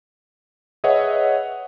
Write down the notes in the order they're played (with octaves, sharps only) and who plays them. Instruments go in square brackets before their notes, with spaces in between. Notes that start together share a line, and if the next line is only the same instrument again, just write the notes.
[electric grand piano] G#4 B4 C#5 D#5 E5 F#5